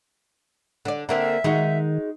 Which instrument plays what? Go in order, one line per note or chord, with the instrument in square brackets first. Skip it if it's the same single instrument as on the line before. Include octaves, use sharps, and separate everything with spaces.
[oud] D3 D5
[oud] D3 A#3 C4 [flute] E5
[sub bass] D#3 [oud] G#3 D#4 F#4